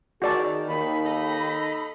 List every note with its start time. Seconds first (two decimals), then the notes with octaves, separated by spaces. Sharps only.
0.22 D#3 F#4 G#4 D5 A5
0.68 D#2 D#3 B5
1.05 D#4 A4 D#5